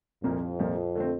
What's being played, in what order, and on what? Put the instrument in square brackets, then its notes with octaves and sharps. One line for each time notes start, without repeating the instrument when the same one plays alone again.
[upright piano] C2 A#2 F3 A#3 [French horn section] F2
[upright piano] C2 A#2 F3 A#3
D3 A3 C4